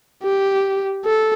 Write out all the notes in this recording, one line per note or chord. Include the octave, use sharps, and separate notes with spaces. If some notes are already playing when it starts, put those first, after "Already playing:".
G4
A4